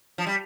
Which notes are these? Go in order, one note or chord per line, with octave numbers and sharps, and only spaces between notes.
F3
G3